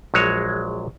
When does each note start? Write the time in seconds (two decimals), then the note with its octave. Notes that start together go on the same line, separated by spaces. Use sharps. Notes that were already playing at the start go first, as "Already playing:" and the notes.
0.14 A#1 F#3 G#3 C#5